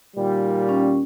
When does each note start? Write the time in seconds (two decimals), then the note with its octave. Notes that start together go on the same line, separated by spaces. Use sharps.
0.16 A#2 D#3 G3
0.69 C#4